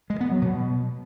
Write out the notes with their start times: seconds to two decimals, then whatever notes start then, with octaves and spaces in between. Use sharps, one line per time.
0.10 G#3
0.21 B3
0.31 F#3
0.42 B2